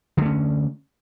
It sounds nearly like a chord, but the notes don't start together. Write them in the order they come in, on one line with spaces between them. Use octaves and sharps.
D3 A3 C#4